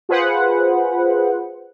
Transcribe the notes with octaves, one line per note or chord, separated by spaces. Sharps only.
F4 G#4 B4 C5 F#5